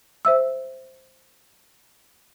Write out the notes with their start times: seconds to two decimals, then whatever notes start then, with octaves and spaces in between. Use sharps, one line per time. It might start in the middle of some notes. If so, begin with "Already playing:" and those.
0.25 C5 E5 E6